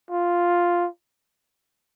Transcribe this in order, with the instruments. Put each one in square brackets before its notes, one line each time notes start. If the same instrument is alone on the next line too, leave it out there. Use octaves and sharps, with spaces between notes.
[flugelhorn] F4